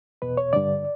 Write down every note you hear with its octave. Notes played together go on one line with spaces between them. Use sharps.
E2 B2 B4
C#5
G2 D3 D5